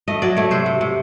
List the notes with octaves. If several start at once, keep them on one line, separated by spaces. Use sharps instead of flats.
A3 D#5
F#3 D5
A3 C#5
C3 C5
C3
C3